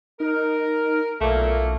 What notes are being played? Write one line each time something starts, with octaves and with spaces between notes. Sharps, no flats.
D#4 A#4
B1 A#2 A3 A#3